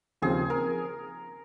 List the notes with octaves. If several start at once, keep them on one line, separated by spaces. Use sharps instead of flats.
D#2 C#3 F3 C4 F4 G#4
A#4